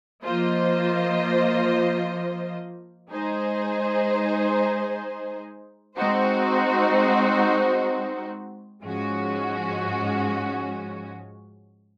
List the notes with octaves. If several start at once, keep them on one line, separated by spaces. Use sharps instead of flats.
F3 A#3 F4 C5 D#5
G#3 D#4 G#4 C5
G#3 C4 D#4 F#4 C5
G#2 F3 G#3 C#4 F#4